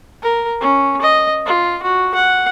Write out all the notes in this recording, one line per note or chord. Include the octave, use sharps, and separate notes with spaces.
A#4
C#4
D#5
F4
F#4
F#5